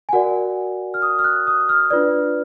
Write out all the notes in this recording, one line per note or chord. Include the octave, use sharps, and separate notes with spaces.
G#5
F#4 A#4 D5 F#5
F6
D#6
F6
F#6
D#6
F6
D4 F4 B4 D5